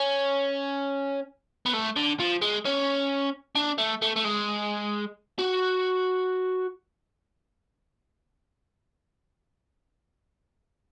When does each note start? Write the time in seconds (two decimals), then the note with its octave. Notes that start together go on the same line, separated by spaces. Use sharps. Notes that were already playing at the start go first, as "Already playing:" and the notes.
Already playing: C#4
1.66 B3
1.73 A3
1.97 D3
2.20 F3
2.42 G#3
2.65 C#4
3.55 D4
3.78 A3
4.02 A3
4.16 A3
4.24 G#3
5.39 F#4